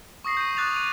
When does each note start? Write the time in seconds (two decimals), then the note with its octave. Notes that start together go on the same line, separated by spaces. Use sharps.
0.25 C#6 D#6 A#6 C7
0.37 G6 D#7
0.57 D6 D#6 F#6 A6 F7
0.76 D#7